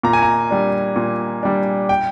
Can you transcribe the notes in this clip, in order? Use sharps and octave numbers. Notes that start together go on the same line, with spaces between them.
A#2 A#5
G#5
A#5
G3 D4
A#2
G3 D4
G5